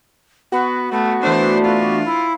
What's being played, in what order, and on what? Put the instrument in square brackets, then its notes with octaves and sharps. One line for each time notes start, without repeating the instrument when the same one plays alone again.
[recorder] B3 [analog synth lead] F#4
[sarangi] A3 [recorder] B3
[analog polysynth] E3 A3 D4 [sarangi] C5
[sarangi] F4
[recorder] E4